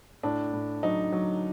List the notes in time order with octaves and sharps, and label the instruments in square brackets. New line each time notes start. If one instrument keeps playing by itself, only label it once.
[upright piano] A2 D4
A2
F#3 D#4
F#3